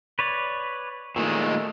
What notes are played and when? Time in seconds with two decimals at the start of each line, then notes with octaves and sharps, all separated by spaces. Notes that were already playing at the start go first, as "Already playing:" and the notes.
0.19 B4 C#5 D5
1.16 A#2 D#3 G#3 A3